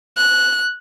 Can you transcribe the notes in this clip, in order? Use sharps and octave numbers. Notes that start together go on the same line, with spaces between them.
F#6